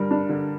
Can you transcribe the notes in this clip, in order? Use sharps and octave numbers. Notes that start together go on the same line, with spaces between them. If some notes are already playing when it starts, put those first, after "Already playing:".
Already playing: G2 D3 G3 A#4
D4
D3